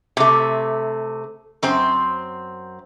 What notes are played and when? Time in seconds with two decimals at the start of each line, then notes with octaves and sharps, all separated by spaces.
0.17 C3 A3
1.63 F#2 C4 C5